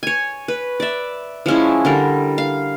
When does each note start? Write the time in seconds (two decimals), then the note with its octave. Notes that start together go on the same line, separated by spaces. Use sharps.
0.03 C#5 G#5
0.48 B4
0.80 D5 E5
1.46 F3 G#3 C#4 E4
1.85 D3 G3 A#4
2.38 F5